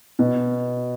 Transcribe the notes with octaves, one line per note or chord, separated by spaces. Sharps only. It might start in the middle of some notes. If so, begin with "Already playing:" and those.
B2